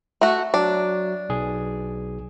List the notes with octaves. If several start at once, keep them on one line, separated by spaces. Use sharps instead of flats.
A3 F#4
F#3 D4
B1 G#4